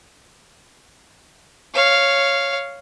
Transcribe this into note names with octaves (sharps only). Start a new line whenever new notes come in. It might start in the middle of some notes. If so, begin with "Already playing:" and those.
C#5 F5